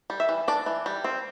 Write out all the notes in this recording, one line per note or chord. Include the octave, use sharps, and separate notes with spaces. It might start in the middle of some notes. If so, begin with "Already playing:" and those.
G3
E5
E3
D4 D5
E3
G3
C4